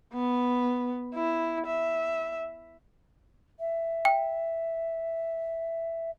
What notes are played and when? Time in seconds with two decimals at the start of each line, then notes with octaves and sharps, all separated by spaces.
0.14 B3
1.15 E4
1.67 E5
3.59 E5
4.05 G5